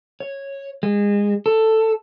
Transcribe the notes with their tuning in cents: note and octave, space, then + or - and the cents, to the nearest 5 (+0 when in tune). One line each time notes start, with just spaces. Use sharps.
C#5 -10
G#3 -25
A4 +10